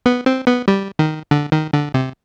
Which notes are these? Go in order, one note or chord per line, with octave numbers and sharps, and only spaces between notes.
B3
C4
B3
G3
D#3
D3
D#3
D3
C3